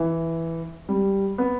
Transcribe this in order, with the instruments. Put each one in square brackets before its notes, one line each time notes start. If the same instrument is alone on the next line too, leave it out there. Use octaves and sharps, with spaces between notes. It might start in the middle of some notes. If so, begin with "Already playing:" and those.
Already playing: [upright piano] E3
G3
B3